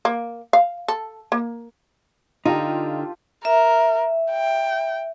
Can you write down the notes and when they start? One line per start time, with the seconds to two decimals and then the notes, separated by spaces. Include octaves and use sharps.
0.05 A#3
0.53 F5
0.88 A4
1.32 A#3
2.45 D3 D#4 F4 G4
3.45 A#4 E5
4.31 G5